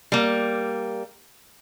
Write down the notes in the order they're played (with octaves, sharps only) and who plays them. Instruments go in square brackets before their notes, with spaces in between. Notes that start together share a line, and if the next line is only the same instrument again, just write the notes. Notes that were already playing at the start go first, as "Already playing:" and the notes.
[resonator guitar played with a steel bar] G3 A#3